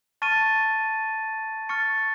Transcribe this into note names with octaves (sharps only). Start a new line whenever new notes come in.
A5 C#6 F6 A6 D#7
C#6 F6 A6 C#7